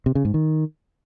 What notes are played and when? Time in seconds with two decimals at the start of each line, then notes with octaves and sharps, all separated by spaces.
0.06 C3
0.15 C#3
0.25 G#2
0.34 D#3